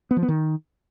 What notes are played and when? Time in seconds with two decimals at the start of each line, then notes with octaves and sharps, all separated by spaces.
0.11 B3
0.17 F3
0.22 B3
0.28 D#3